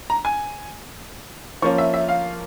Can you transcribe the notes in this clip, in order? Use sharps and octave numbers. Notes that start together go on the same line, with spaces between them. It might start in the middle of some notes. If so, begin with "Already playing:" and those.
A#5
G#5
F3 A#3 C#4 C#6
E5
E5
F5